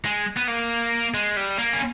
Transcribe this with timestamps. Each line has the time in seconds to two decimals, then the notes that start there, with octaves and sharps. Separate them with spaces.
0.05 G#3
0.37 B3
0.48 A#3
1.14 G#3
1.36 G3
1.59 A#3
1.73 C#4